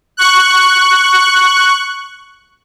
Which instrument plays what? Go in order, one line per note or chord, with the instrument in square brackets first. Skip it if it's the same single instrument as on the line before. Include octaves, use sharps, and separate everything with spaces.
[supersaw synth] C#6 F#6